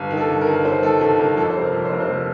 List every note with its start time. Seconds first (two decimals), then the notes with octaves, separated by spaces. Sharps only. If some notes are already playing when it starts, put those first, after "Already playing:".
Already playing: G1
0.11 D#3
0.17 A4
0.29 G1
0.41 A#4
0.47 G1
0.65 G1 C5
0.83 D#3 A4
1.01 G1 A4
1.18 G1 A#4
1.37 F2 A4
1.50 C3 C5
1.61 A#4
1.73 F2
1.85 C5
1.91 F1 A#4
2.00 C5
2.09 F1 A#4